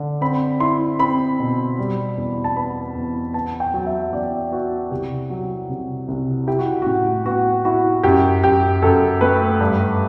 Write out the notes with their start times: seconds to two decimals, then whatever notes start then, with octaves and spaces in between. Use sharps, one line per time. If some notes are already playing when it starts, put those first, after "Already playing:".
Already playing: D3
0.21 C4 B5
0.60 E4 C6
0.99 C4 B5
1.39 B2
1.79 G3
2.17 E2
2.44 A5
2.56 B3 B5
2.95 E2
3.34 B3 A5
3.60 G5
3.74 F#3
3.86 E5
4.12 E2 D5
4.51 B3 F#4
4.91 C2 G4
5.30 F#3
5.69 C3
6.08 C2
6.47 E4 G4
6.59 F#4
6.82 A2 F#4
7.25 B3 F#4
7.65 E4 F#4
8.03 F#2 G4
8.44 F#2 G4
8.82 F#2 A4
9.21 A3 B4
9.61 G2